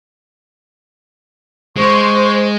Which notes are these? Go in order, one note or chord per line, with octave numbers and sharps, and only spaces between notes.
G#3 C5 C#6